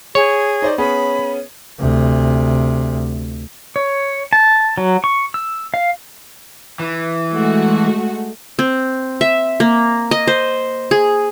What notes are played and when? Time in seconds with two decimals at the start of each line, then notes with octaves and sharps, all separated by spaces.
0.15 G#4 C#5
0.62 D#4 C5 D5
0.78 B3 C#4 G#4 B5
1.79 D2 C3
3.76 C#5
4.33 A5
4.78 F#3
5.04 C#6
5.34 E6
5.74 F5
6.80 E3
7.31 G#3 A3 F#4
8.59 C4
9.21 E5
9.60 A#3
10.11 D#5
10.27 C5
10.91 G#4